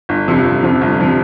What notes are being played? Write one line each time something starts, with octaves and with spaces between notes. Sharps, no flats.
G1
F2 C3 F3
G1
F2 C3 F3
G1
C3 F3